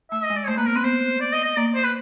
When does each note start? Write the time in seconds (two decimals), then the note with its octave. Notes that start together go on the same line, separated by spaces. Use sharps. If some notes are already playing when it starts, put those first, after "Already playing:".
0.11 A3 E5
0.23 D#5
0.30 G#3
0.36 D5
0.43 C#5
0.48 A3 C5
0.57 A#3 B4
0.66 B3 A#4
0.75 C4 B4
0.84 B3 C5
1.21 D5
1.32 D#5
1.44 D#5
1.57 A#3 D5
1.75 C5
1.84 B4